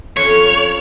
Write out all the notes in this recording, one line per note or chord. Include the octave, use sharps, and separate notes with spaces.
F2 C#4 C#5